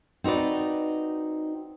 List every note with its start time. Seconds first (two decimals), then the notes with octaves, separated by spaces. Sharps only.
0.24 C4 D#4 F#4 B4 D5